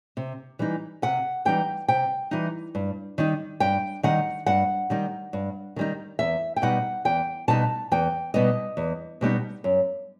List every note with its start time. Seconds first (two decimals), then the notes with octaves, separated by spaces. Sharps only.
0.17 C3
0.59 E3 G3 D#4
1.02 C3 F#5
1.45 E3 G3 D#4 G5
1.88 C3 G5
2.31 E3 G3 D#4
2.75 G2
3.18 D#3 G3 D#4
3.60 G2 G5
4.03 D#3 G3 D#4 F#5
4.46 G2 F#5
4.90 D#3 G3 D#4
5.33 G2
5.76 D#3 G3 D#4
6.19 E2 E5
6.56 G5
6.62 B2 G3 B3 D#4 F#5
7.05 E2 G5
7.48 B2 G3 B3 D#4 A5
7.92 E2 G5
8.34 B2 G3 B3 D#4 D#5
8.77 E2
9.21 B2 G3 B3 D#4
9.64 F#2